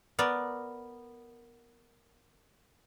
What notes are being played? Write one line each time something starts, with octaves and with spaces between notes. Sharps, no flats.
B3 A#4 D5